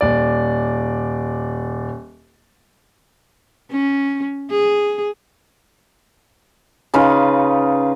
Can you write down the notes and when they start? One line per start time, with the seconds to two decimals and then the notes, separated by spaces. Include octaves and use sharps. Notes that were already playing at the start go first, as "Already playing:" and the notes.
0.01 D#1 D5
3.71 C#4
4.51 G#4
6.94 C#3 D#4 F4 B4